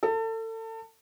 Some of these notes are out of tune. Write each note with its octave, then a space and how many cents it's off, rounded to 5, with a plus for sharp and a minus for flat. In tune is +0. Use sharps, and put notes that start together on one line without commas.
A4 +30